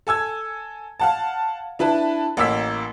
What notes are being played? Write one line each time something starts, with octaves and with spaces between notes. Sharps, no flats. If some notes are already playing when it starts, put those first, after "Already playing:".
A4 G#5 E6 G#6
F5 F#5 A5
D4 E4 B4 A5
A1 A#3 E6 B6